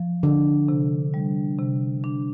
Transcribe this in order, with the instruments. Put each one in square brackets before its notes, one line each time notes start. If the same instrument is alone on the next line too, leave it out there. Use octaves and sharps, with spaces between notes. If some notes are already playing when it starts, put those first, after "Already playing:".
Already playing: [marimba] F3
[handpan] D3 [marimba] D4
[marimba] C3
G3
C3
D4